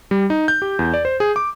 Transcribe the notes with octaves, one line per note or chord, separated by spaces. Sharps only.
G3
D#4
G6
G4
E2
D5
C5
G#4
D6